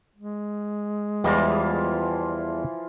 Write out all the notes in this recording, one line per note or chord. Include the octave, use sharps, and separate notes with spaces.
G#3
E2 E3 F3 G3 F4 D#5